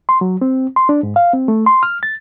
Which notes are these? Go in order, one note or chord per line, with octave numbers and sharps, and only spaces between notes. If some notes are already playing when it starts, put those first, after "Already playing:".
C6
F#3
C4
C6
D4
G#2
F5
C4
A3
C6
F6
A6